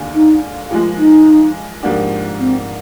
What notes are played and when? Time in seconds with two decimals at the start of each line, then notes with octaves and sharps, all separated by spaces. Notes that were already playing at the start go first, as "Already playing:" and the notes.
Already playing: D#2 D3 G#3 D4 F4
0.14 D#4
0.70 A#2 F3 G#3 F4
0.98 D#4
1.83 G#2 F3 A#3 D4 G4
2.39 C4